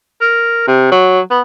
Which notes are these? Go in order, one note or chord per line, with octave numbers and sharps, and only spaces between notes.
A#4
C3
F#3
B3